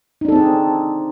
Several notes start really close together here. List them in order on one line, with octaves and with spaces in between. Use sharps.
D#4 D4 A4 C4 G#4